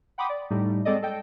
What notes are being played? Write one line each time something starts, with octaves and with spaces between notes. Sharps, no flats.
F#5 G5 B5 C6 D6 D#6
D5
A2 G3 A3 D#4
G#3 C4 G#4 A4 D5 D#5
A4 D#5 G5